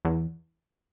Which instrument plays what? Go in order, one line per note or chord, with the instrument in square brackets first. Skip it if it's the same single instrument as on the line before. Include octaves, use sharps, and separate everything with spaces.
[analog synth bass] E2